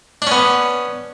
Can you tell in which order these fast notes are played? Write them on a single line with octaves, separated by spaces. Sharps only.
D4 C#4 B3